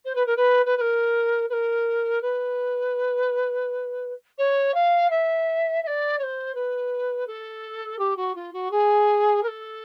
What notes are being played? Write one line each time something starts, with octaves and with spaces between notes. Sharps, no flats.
C5
B4
A#4
B4
B4
B4
A#4
B4
A#4
B4
C#5
F5
E5
E5
D5
C#5
C5
B4
A4
G4
F#4
F4
F#4
G#4
A#4
A4